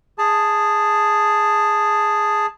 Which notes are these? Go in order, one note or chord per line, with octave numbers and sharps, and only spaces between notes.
G#4 A5